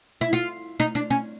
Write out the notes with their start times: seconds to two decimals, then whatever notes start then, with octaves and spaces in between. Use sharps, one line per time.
0.21 E4
0.33 F4
0.80 D#4
0.95 D4
1.10 C#4